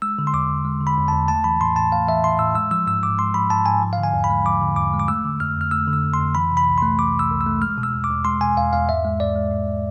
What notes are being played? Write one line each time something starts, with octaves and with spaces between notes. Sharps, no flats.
G#3 E6
D3
C6
E2 D6
E2
G#3
D3
B5
E2
E2 A5
A3 A5
E3 B5
A2 C6
A2 A5
A3 F5
E3 E5
A2 C6
A2 E6
G#3 E6
F3 E6
G#2 E6
G#2 D6
G#3 C6
F3 B5
G#2 A5
G#2 G#5
F3
F5
D3
G#5
E2
B5
G#3
F3 D6
D3
E2 D6
G#3
D6
A3 E6
D3
F2 F6
F2 F6
A3 E6
D3
E6
F2
C6
F2
E3 B5
C3
B5
C2
A3 C6
E3 D6
C3
E6
C2
E6
A3
G#3 F6
B2
E6
E2
D6
E2
G#3 C6
B2 G#5
E2 F5
E2 F5
G#2 E5
G#3
G#2 D5
G#3
G#2
G#3